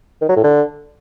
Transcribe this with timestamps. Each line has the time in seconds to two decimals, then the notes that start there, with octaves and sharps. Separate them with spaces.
0.22 D#3
0.29 F#3
0.36 A2
0.44 D3